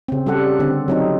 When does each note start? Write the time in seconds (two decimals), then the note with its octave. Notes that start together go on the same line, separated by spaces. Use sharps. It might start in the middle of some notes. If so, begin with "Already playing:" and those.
0.08 C#3 C4
0.26 G3 G4 A4 F#5
0.59 D3 C4
0.88 F#3 C4 D#4